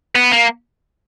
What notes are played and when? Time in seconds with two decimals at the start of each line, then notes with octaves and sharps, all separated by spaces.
0.15 B3
0.32 A#3